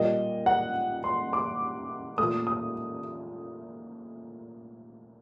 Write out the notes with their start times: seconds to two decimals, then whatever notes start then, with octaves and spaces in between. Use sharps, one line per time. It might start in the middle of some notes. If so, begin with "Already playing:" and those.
Already playing: A#2 G3 A#3 D#5
0.46 F#5
1.04 C6
1.33 D6
2.18 A#2 A3 D#6
2.47 D#6